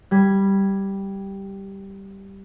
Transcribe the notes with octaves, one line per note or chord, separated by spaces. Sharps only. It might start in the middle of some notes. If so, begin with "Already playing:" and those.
G3 G#6